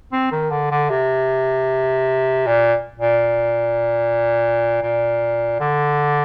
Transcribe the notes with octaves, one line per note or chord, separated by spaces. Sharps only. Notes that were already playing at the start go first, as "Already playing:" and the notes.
C4
D#3
D3
D3
C3
A#2
A#2
A#2
D3